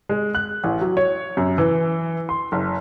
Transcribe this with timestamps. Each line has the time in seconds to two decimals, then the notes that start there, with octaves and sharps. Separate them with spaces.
0.09 G#3
0.35 F#6
0.64 A1
0.81 F#3
0.97 C#5
1.37 F#2
1.58 E3
2.29 C6
2.52 F#1